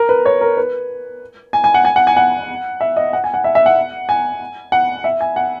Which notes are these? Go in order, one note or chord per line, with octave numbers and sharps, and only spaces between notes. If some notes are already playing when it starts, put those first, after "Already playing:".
Already playing: A#4
B4
C#5
A#4
B4
G#5
G#5
F#5
G#5
F#5
G#5
F#5
E5
D#5
F#5
G#5
F#5
E5
E5
F#5
G#5
F#5
E5
G#5
F#5